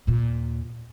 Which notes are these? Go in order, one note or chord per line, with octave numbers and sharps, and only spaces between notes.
D#2 A#2